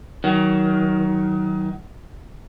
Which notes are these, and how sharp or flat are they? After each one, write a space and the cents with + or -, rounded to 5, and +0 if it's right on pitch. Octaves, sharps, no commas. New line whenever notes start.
D#3 +25 F#3 +30